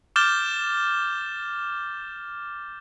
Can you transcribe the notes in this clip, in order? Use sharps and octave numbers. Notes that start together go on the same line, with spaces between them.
D6 F6 G6 A6 E7 G7